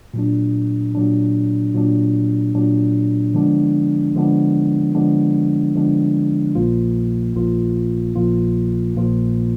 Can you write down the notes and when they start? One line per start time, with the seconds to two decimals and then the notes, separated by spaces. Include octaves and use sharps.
0.14 A#2 F#3 D4
0.95 A#2 F#3 D4
1.74 A#2 F#3 D4
2.55 A#2 F#3 D4
3.34 D3 F3 G#3 B3 D4
4.15 D3 F3 G#3 B3 D4
4.95 D3 F3 G#3 B3 D4
5.75 D3 F3 G#3 B3 D4
6.55 A#1 A#2 F3 A#3 F4
7.35 A#1 A#2 F3 A#3 F4
8.16 A#1 A#2 F3 A#3 F4
8.96 A#1 A#2 F3 A#3 F4